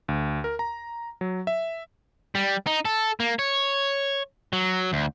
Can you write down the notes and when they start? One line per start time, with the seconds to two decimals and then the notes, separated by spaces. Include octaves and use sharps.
0.08 D2
0.44 A#4
0.59 A#5
1.21 F#3
1.47 E5
2.35 G3
2.67 D#4
2.85 A4
3.20 A#3
3.39 C#5
4.53 F#3
4.93 D2